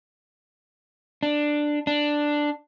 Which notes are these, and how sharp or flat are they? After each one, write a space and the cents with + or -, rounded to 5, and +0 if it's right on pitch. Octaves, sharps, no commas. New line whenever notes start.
D4 +10
D4 +5